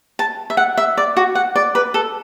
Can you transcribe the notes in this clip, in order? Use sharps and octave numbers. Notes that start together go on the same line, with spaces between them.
A5
E5
F#5
E5
D5
F#4
F#5
D5
B4
A4